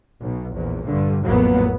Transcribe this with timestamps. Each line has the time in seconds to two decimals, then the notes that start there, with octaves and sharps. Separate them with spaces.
0.22 B1 B2
0.55 A#1 E2 A#2
0.85 G2 D3
1.25 A1 F2 A2 F#3 A#3 B3